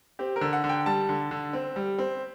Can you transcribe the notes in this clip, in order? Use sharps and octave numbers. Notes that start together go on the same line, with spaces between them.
C4 G4
A#4
D3
F#5
D3
G5
G3 A5
D3
D3
C4
G3
C4